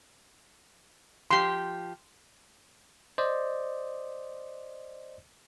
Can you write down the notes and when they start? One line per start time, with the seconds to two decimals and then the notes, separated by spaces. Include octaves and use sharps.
1.31 F3 G4 C6
3.18 C5 D5 D#5